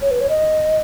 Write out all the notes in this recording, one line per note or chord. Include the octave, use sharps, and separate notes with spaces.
C#5
B4
C#5
D#5